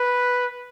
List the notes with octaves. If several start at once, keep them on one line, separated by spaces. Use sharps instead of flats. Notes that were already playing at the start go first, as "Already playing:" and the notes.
Already playing: B4